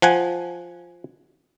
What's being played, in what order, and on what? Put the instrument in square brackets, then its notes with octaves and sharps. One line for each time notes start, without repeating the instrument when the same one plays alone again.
[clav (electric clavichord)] F3 F#5 G#5